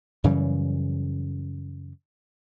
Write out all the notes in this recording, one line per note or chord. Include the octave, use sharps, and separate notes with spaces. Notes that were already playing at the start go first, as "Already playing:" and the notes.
F#2 C#3 E3 G3